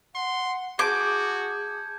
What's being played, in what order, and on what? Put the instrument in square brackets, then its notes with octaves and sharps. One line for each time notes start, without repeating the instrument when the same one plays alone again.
[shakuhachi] F#5 [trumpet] C6
[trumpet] F#4 [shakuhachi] G#4 [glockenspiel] A5 G6 G#6 [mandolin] D6